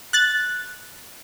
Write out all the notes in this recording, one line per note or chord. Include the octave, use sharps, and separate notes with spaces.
F#6 A6